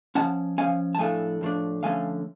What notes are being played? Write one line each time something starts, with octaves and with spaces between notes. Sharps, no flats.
F3 G#3 C#4 F#5 A5
F3 G#3 C#4 F5 G#5
A5
A2 F3 A3 D4 F5 G#5
A2 F3 A3 D4
D3 F3 A3 C#4 F5 G#5